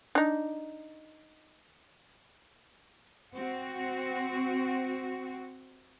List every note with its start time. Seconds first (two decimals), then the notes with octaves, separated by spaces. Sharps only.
0.15 D4 D#4
3.34 C4 F#4